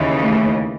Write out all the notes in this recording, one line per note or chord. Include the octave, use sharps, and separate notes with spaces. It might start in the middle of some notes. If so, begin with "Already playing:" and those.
Already playing: D#2 C#3 E3
A3